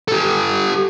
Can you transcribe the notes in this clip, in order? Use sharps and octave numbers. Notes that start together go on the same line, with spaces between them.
G4 A4